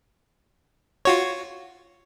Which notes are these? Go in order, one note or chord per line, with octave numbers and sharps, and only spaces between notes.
F4 F#4 C#5